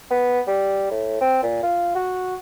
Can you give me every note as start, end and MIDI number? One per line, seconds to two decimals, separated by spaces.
0.10 0.40 59
0.47 0.87 55
0.90 1.17 45
1.21 1.40 60
1.43 1.61 46
1.63 1.95 65
1.95 2.35 66